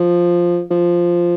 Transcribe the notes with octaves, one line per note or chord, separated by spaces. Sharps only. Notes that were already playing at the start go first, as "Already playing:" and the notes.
Already playing: F3
F3